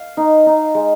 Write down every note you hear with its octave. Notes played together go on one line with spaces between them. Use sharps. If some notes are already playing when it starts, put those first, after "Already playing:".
Already playing: F5
D#4
D#4
G#3